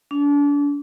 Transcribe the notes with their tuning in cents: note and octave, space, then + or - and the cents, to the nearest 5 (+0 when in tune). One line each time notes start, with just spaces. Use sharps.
D4 -35